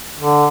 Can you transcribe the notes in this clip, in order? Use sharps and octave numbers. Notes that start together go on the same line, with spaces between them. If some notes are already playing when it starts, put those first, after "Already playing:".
D3